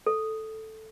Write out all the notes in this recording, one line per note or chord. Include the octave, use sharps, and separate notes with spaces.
A4